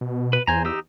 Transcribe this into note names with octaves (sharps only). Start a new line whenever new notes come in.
B2
B4
E2 C5 G#5 A#5
D#4 G4 E6